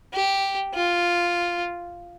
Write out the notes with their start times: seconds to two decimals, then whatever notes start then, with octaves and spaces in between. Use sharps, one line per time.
0.14 G4
0.75 F4